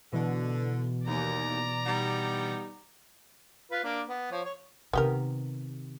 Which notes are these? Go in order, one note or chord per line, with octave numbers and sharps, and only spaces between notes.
B2 D3 E3
D#2 D5 A#5
G3 B3 D#4
F4 B4
A#3 D4
B3
F3 C#5
C#5
C3 D#3 B3 G4 A#4